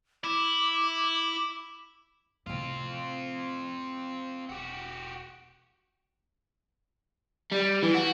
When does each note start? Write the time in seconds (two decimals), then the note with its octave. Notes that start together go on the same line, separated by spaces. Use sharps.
0.24 E4 D6
2.47 A2 C3 C4 F4
4.49 E1 F#4 G4
7.52 G3
7.83 E3
7.95 F#4